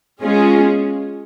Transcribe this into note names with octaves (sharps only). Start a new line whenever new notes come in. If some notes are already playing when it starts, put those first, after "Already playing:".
G#3 C#4 F4 G#4